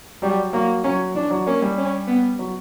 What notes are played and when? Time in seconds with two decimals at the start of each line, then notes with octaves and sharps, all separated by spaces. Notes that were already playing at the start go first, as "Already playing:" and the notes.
0.22 F#3 G3
0.53 F#3 A#3
0.84 F#3 C#4
1.15 E3 D4
1.30 F#3
1.47 A#3 C#4
1.62 G3
1.78 C#4
2.08 B3
2.39 F#3